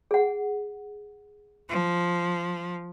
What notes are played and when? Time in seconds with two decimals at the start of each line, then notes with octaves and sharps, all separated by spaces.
0.11 G#4 F#5
1.69 F3